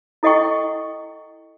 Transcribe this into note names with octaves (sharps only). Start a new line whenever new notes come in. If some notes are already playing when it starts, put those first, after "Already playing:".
E4 A4 D#5 F#5 G5 C#6